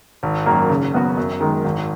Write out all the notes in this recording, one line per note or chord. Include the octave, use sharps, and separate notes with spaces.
G#1
F#2 D#3 A#3
C#3
F#3 B3 F#4
F#2
D#3 G#3
G#1